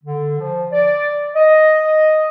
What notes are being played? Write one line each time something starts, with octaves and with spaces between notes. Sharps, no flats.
D3
F3
D5
D#5